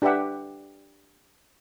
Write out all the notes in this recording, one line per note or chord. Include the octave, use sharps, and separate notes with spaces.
D4 G4 B4 E5 F#5